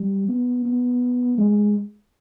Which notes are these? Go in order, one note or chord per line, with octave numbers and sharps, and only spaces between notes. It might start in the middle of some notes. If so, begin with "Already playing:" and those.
Already playing: G3
B3
B3
G#3